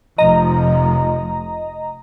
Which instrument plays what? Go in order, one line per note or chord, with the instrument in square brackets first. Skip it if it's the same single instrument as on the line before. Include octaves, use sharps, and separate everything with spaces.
[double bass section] F1 F3 [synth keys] D#5 A#5